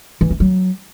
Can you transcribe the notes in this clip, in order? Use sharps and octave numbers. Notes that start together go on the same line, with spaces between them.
E3
A3
F#3